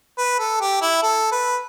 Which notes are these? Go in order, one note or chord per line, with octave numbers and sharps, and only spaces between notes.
B4
A4
G4
E4
A4
B4